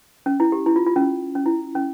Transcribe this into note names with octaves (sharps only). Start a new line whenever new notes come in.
C#4
E4
G4
E4
F4
F4
C#4
C#4
E4
C#4